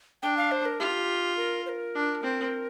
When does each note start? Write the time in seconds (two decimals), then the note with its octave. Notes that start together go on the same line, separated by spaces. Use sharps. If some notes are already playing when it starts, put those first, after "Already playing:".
0.22 D4 G5
0.37 F5
0.51 C5
0.66 A#4
0.80 F4 G4
1.37 A#4
1.66 C5
1.69 A#4
1.95 D4
2.23 C4